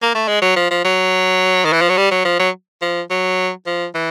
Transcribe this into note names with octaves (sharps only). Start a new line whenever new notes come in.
A#3
A3
G#3
F#3
F3
F3
F#3
D#3
E3
F3
F#3
G3
F#3
F3
F#3
F3
F#3
F3
E3